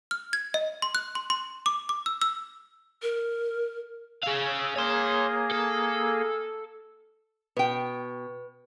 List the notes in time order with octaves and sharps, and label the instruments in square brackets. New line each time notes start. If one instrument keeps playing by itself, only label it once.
[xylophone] F6
G#6
D#5
C6
F#6
C6
C6
D6
D6
E6
E6
[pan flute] A#4
[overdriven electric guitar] G#4 F5 [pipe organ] E6
[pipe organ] A#3 G#4 [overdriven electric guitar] C#5 C6
[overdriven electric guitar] A4
[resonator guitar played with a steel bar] B2 G5 [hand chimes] B4